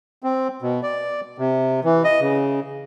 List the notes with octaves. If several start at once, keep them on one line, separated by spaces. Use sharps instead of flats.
C4
B2
D5
C3
E3
D#5
C#3